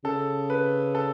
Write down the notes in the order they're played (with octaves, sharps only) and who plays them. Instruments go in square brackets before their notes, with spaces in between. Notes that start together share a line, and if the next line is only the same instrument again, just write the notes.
[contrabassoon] C#3 [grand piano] A4
[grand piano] B4
A4